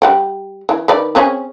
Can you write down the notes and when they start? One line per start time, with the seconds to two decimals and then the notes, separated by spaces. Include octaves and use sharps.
0.02 G3 F#5 G5
0.69 E3
0.88 D#3 B4 D5
1.15 C4 C#4 G#4